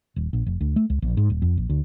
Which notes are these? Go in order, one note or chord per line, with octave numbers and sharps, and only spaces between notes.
D#1
A#1
F1
D2
A3
C#2
A#1
G#2
D#1
F2
A#1
D2